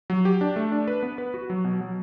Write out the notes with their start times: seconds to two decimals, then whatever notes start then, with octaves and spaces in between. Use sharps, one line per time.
0.10 F#3
0.25 G4
0.41 D4
0.56 A3
0.72 D4
0.88 B4
1.03 B3
1.18 B4
1.34 F#4
1.50 F#3
1.64 B2
1.81 F#3